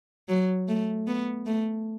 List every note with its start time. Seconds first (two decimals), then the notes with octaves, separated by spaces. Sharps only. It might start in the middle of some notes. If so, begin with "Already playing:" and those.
0.29 F#3
0.69 A3
1.07 B3
1.46 A3